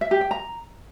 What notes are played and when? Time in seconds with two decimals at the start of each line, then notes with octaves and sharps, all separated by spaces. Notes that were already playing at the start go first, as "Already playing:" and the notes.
0.01 E5
0.11 G4
0.21 G5
0.31 A#5